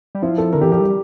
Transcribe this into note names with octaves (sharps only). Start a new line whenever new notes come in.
G3
F3 E4
A4
D3 A#4
E3 G4
F3 G4
G3